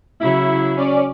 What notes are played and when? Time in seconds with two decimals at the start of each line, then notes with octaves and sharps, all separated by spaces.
0.21 C#3 F#3 E4
0.76 C#4 D5